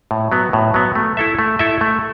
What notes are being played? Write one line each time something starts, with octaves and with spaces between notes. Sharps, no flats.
A2
F#3 B3
A2
F#3 B3
A3
E4 A4 E5
A3
E4 A4 E5
A3